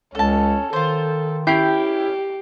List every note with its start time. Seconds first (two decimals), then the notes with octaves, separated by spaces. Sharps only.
0.15 C#2 C#4 A4 A5
0.73 D#3 F4 A4 C5
1.47 C#4 E4 G4 G5 G6 C7